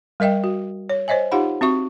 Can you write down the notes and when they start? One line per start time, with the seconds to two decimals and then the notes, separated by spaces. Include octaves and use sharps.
0.20 G3 A#4 D#5 E5 G5
0.44 F#4
0.90 C#5
1.08 C5 C#5 D#5 E5 G#5
1.31 D#4 F4 G4 F5 F#5 B5
1.61 C4 F#4 E5 C#6